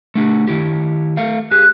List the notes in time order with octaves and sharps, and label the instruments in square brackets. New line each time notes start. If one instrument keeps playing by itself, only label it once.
[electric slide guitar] A3 D4 G4
D#3 E4 G4
A3 F5
[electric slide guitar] G4 G#4 [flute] F#6